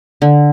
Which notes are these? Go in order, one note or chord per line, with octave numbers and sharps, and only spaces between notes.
D3